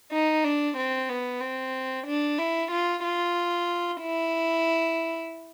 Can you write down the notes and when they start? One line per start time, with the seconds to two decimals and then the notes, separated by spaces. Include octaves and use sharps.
0.12 D#4
0.44 D4
0.77 C4
1.09 B3
1.40 C4
2.06 D4
2.38 E4
2.71 F4
3.03 F4
4.01 E4